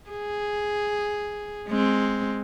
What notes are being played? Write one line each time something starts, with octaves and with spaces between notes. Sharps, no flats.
G#4
G#3 C4